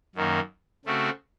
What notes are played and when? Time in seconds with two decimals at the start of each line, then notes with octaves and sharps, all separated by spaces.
0.15 F#2 D#3 A#3
0.85 C#3 A3 C4 F#4